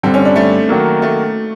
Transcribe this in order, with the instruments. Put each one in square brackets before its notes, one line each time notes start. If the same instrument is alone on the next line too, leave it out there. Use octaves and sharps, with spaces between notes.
[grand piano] G2 D3 G3 [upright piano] C4
[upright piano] C#4
D4
A3
[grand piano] D#3 F#3 A#3
[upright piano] A3